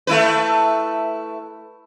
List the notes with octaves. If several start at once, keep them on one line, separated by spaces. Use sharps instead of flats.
A3 E4 B4